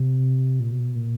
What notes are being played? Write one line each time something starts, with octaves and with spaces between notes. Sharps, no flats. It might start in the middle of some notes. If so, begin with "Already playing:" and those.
Already playing: C3
A#2
B2
A#2